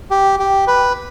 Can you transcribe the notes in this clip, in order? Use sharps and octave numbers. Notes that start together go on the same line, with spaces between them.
G4
G4
B4